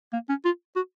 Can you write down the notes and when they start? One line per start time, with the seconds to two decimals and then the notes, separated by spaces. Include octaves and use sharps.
0.13 A#3
0.29 C#4
0.45 F4
0.76 F#4